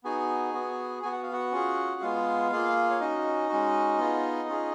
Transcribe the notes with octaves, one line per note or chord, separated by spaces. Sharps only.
B3 D#4 F#4 G#4 G#5
B3 F#4
B3 F#4 G#5
F#5
F5
F#4 F#5
C#4 F4 G#4
G#3 B3 F4 G#4 F5
A#3 F4 G#4
C#5
C#4 D#4 F#4 D#5
G#3 C#4 F#4
B3 F4 G#4
C#4 F4 G#4